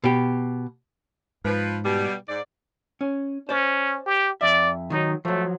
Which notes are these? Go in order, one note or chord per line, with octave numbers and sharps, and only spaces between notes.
B2 G4
G#2 F3 B4
B2 G3
G#2 D5
C#4
C#4 C5 D5
G4
F2 D5 E5
D#3 E3 F#3 D#4
F3 F#3 A3